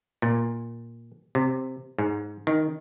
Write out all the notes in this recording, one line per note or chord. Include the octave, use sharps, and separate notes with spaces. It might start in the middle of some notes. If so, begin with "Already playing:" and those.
A#2
C3
G#2
D#3